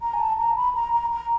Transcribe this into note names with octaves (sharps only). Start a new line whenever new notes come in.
A#5
G#5
A5
A#5
B5
A#5
A#5
A#5